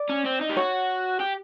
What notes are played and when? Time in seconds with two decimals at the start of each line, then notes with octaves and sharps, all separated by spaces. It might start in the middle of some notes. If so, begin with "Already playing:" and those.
Already playing: D5
0.09 C#4
0.25 C4
0.41 D#4
0.49 G4
0.57 F#4 C#5
1.20 G4